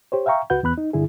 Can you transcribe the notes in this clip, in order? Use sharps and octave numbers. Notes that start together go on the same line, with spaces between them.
G4 C5 C#5
E5 F5 G5 A#5 C#6
C#2 F#4 B4 F#5 G6
E2 B3 B5 F#6
D#4
G2 D3 E4 G#4